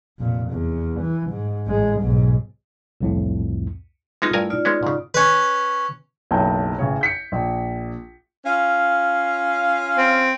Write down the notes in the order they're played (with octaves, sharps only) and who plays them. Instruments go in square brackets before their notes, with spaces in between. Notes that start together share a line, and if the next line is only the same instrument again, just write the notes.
[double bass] F1 A#2
E2
E3
G#2
A1 G#3
B1 G#2
[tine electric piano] C2 F2 A2
[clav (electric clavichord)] G#3 B3 D#4 [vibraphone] F4 A4
[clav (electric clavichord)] G2 A#4 G#5 [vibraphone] A3 E4
[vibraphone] D#4 F4 D5
[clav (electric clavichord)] G#3 B3 C#4
G#2 C#3
[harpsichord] C#4 B4
[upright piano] F#1 B1 G5 A5 G6
A1 C#3 C#5
G6 B6 C#7
A#1
[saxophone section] C#4 F4 F5
[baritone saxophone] C4